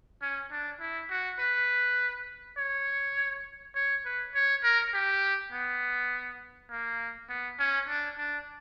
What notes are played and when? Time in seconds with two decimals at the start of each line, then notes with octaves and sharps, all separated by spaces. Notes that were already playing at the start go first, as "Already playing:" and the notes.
0.22 C#4
0.51 D4
0.80 E4
1.10 F#4
1.39 B4
2.57 C#5
3.75 C#5
4.05 B4
4.35 C#5
4.64 A#4
4.93 G4
5.52 B3
6.70 A#3
7.30 B3
7.59 C#4
7.88 D4
8.18 D4